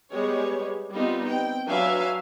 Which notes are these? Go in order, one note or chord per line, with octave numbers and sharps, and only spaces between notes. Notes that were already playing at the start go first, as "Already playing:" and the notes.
G3 G#3 B3 C#5
G3 B3 C4 D#4 F4
C4 G5
F#3 D4 B4 E5 F5 G#5